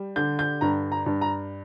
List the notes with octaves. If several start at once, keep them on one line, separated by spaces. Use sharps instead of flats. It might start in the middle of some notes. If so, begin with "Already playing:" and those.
Already playing: G3
D3 G6
G6
G2 A#5
A#5
G2
A#5